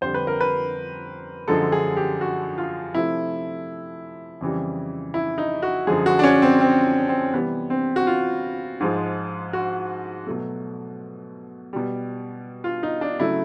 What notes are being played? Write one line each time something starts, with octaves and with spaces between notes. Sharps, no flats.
F2 D3 G3 C5
B4
A#4
B4
F#2 D3 F3 G#3 A4
G#4
G4
F#4
F4
C3 F3 A3 E4
F2 C#3 E3 G3
E4
D#4
F#4
F#2 D3 F3 G#3 G#4
F#4
D4
C#4
C4
C4
C4
C3 E3 G3 B3
C4
F#4
F4
G#2 F3 G#3
F#4
B2 F#3 A3
B2 G3
F4
D#4
D4
C#3 F#3 A3 E4